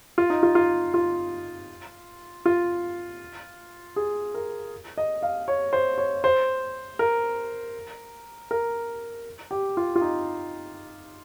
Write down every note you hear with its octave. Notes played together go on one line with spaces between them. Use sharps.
F4
D#4
F4
F4
F4
F4
G#4
A#4
D#5
F5
C#5
C5
C#5
C5
A#4
A#4
G4
F4
F4
D#4